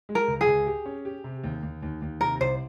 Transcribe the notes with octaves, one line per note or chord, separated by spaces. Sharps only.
G#3
A#4
C#2
G#4
C#2
G4
C#4
G4
C3
D#2
D#2
D#2
D#2
C3 A#4
C2 C5